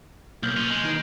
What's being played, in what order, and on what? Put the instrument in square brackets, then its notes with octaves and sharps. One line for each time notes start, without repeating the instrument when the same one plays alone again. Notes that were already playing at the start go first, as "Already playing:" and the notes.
[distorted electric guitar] B1 [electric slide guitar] A#3 A#4 [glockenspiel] F6 G6 F#7
[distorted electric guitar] C#4 F4
G#3
[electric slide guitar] D#3 D#4 B4 [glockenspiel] G6 D7